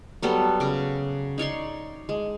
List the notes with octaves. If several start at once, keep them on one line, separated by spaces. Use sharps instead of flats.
F#3 G3 B3 A4
C#3 D6
D#4 C#5 D5 C6
G#3